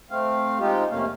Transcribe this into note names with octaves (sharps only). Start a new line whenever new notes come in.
A3 C4 F5
G#3 C4 D#4 F4 G4
F2 C3 A3 A#3 C#4 F5